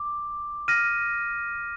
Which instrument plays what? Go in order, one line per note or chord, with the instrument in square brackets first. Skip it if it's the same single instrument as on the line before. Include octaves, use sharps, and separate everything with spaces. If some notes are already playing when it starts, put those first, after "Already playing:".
Already playing: [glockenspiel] D6
F6 A#6 D#7